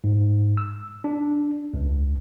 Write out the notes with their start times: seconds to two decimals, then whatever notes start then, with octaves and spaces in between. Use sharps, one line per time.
0.04 G#2
0.57 E6
1.04 D4
1.74 C#2